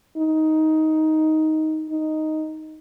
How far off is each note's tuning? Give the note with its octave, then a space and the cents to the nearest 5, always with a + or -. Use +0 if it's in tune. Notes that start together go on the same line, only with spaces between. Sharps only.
D#4 +10
D#4 +0